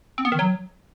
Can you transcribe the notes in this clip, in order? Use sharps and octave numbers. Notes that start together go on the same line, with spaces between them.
C4
B3
D#3
F#3